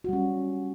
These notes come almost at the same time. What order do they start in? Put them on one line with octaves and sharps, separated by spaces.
F#4 G3 C#4